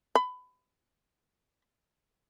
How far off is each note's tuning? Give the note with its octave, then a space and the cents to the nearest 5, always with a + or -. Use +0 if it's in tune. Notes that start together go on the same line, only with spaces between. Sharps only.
B5 +25